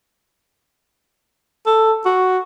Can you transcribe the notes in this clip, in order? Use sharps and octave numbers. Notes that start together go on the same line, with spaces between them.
A4
F#4